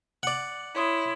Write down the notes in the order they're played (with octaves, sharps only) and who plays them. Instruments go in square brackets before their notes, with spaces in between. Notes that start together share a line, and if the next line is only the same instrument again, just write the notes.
[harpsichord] D5 F#5
[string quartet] E4 [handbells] C#5 C6 D#6